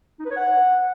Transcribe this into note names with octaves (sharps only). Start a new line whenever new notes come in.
D#4
B4
C#5
F#5